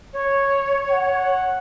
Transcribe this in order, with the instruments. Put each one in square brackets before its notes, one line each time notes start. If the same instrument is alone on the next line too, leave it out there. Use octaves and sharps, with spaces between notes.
[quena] C#5
[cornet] F#5